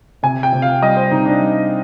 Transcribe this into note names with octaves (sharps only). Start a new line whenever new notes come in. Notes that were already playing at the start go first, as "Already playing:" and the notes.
C3 G#5
G5
C3
F5
G3 D#5
C5
C3 D#4
D4
G3